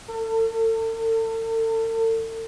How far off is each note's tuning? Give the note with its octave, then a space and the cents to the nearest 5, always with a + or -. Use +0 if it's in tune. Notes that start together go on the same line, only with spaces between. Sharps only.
A4 +40